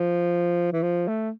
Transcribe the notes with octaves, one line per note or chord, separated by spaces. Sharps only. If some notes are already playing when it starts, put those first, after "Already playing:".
Already playing: F3
E3
F3
A3